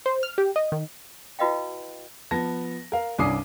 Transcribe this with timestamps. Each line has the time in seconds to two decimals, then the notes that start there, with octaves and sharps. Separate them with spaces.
0.06 C5
0.23 F6
0.38 G4
0.56 D#5
0.72 D#3
1.39 E4 F#4 B4 D#5 F5 G5
2.31 F3 B3 A5 A#6
2.92 A#4 F5
3.19 C2 G2 C#4 D6 D#6 C7